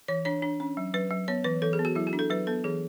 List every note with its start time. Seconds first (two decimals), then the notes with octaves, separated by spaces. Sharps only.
0.08 E3 C#5
0.25 D4 C#5
0.42 D4
0.60 C#4
0.77 F#3
0.94 F#3 B4
1.11 F#3
1.28 B3 C#5
1.44 E3 B4
1.62 E3 A4
1.73 G#4
1.79 B3
1.85 F#4
1.95 F#3 E4
2.07 F#4
2.13 D4
2.19 A4
2.30 F#3 B4
2.47 B3 A4
2.64 E3 G#4